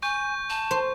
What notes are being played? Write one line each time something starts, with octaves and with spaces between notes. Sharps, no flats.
G#5 C#6 G6
A5
C5